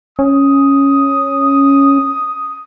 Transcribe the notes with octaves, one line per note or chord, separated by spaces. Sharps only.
C#4 D#6